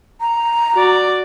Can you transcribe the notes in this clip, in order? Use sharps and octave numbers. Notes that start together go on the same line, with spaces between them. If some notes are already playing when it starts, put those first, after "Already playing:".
A#5
F#4 D5